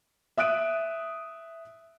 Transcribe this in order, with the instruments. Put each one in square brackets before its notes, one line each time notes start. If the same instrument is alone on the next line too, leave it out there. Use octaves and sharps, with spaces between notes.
[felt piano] E5 D#6 F#6 D7 D#7